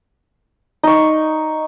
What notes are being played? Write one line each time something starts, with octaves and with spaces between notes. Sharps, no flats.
D#4 C#6